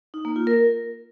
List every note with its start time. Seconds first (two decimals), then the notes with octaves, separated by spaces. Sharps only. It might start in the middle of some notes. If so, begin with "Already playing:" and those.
0.14 D#4
0.25 A#3
0.36 F4
0.47 A#4